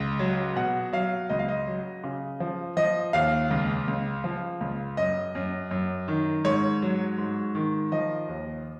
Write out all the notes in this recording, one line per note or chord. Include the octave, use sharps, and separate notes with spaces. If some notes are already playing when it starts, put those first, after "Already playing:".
Already playing: C#2
F#3
B2 F#5
F#3 F5
C#2 D#5
F5
D#5
F#3
C#3
F3
F3 D#5
D#2 F5
C#2
C#2
F3
C#2
F#2 D#5
F#2
F#2
D#3
G#2 C#5
F#3
G#2
D#3
F3 D#5
D#2